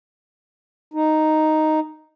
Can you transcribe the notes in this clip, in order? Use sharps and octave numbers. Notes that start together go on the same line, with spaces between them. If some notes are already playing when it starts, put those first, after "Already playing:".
D#4